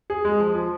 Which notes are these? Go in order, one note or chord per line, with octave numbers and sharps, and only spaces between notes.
G#4
G#3
F3
F3